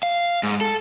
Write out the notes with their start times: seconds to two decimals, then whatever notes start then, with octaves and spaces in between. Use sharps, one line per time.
0.03 F5
0.43 G#2
0.61 A4